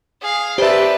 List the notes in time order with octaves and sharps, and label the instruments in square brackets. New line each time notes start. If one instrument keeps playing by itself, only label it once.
[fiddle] G#4 F5
[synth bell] G4 [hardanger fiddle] B4 [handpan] C5 E5 [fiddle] D5 A5